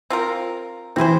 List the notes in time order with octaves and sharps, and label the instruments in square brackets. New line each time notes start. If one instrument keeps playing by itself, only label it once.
[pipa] C4 F4 A#4
[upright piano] E3 [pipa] C4 E4 G#4 C5